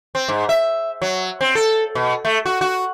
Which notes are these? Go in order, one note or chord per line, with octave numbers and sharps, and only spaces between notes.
C4
G#2
E5
F#3
C4
A4
B2
A3
F#4
F#4